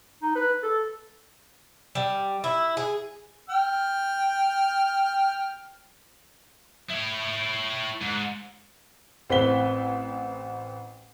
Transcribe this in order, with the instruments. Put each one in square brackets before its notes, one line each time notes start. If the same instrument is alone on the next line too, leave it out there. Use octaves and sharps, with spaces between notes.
[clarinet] D#4
B4
A4
[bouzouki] G3
E4
G#4
[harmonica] G5 F6
[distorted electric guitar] E4 C#5
G#2
[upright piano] A1 C4 B4 B6 G7